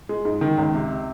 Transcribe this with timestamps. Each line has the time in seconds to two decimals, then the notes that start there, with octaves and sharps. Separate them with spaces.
0.09 G#3
0.25 G#2
0.41 D#3
0.58 C#2
0.74 C3